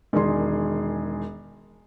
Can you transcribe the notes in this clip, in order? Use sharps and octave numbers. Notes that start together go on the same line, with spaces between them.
E1 D#3 G#4 C6